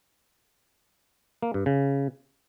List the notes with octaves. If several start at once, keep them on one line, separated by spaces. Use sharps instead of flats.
A#3
G2
C#3